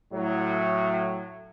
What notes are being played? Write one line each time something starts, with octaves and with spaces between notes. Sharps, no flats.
A2 F#3